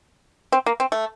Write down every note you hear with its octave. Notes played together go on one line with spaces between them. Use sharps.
C4
A#3
C4
A3